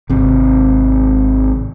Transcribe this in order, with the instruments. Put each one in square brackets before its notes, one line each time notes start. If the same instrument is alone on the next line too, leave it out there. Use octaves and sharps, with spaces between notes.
[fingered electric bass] G#1 C3